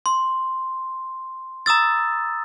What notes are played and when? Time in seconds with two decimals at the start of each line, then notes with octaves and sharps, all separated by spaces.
0.06 C6
1.66 A#5 D#6 E6 A6